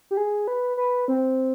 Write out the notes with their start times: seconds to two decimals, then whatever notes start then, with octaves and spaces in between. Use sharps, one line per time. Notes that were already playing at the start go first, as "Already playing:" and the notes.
0.11 G4
0.17 G#4
0.48 B4
0.77 B4
1.08 C4